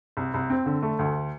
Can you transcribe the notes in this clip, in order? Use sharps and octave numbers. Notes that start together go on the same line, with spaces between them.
C2
C2
C4
D3
A3
D2